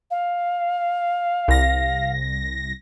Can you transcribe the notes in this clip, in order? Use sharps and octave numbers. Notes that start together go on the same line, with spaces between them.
F5
C2 A#6